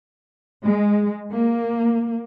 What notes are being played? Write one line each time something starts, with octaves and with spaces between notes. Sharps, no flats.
G#3
A#3